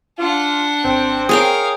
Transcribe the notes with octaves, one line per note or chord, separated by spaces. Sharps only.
D4 F4 F#5
G#1 C4
G#4 A#4 C#5 F5 G5 D#6